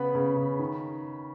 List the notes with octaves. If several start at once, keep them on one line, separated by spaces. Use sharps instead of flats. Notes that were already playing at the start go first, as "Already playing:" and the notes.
Already playing: C#3 B3 B5
C#3
C#3
D#3